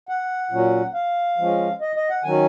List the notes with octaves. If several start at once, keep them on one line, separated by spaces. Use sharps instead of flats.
F#5
A#2 F#3 C#4
F5
F3 G#3 C#4
D#5
D#5
F#5
D#3 F#3 C#4 G#5